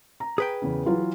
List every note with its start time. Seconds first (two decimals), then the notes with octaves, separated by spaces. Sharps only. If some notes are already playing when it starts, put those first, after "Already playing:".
0.20 A#5
0.38 G#4 B4 G5
0.62 E2 C#3
0.86 E3 F#3 F4